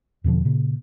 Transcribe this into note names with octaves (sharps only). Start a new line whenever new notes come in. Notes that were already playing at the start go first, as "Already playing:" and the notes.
E2 B2 D3 F3
A#2 C#3